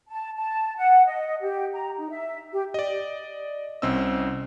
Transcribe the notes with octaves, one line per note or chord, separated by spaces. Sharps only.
A5
A5
F#5
D#5
G4
A#5
D#4
E5
G4
D5 D#5
C2 C4 C#4 D#5 E6